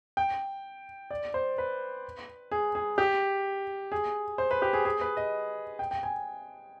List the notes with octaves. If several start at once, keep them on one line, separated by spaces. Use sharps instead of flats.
G5
D5
C5
B4
G#4
G#4
G4
G#4
C5
B4
G4
G#4
G#4
B4
D#5
G5
G5
G#5